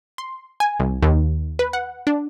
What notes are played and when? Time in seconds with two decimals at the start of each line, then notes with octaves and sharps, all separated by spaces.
0.18 C6
0.60 G#5
0.80 C2
1.03 D#2
1.59 B4
1.73 F#5
2.07 D4